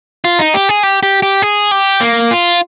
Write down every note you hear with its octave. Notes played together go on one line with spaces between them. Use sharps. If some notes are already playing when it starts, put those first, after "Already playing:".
F4
D#4
G4
G#4
G4
G4
G4
G#4
G4
A#3
F4